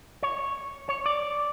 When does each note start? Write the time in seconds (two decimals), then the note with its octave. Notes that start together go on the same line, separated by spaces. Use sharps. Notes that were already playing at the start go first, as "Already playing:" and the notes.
0.23 C#5
0.89 C#5
1.06 D5